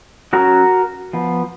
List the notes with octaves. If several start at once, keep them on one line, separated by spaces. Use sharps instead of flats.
F#3 C#4 F#4 A#4
F3 B3